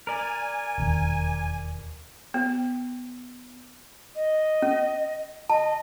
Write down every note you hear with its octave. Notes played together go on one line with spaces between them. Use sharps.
A#4 D5 G#5
E1 D#2
B3
D#5
C#4
D#5 A5